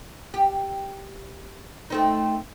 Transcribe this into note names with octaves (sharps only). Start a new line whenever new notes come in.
G4
A3 C4 D#4